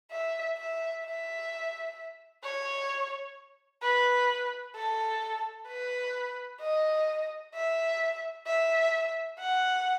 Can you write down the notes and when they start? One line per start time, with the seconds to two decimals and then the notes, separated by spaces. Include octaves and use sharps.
0.11 E5
0.58 E5
1.04 E5
2.43 C#5
3.82 B4
4.76 A4
5.68 B4
6.61 D#5
7.54 E5
8.46 E5
9.39 F#5